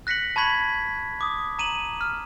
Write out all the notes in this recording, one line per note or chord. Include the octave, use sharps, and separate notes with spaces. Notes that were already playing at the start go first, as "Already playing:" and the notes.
F#6 A#6 B6 C#7 F#7
A5 B5 C#6 G#6 B6 F#7
D6 D#6
A#5 D#7 E7 F#7
F6